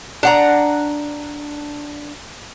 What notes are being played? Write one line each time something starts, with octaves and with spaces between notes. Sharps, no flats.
D4 F#5 A#5